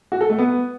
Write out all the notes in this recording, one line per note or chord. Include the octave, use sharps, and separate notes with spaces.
F#4
A4
A3
B3